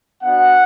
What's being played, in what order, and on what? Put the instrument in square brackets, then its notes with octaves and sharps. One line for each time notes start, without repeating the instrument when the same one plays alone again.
[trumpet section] B3 D4 F#4 F#5